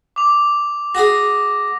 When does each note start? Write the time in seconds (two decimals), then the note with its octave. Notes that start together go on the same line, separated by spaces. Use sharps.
0.16 D6 F7
0.95 F#4 G#4 A#6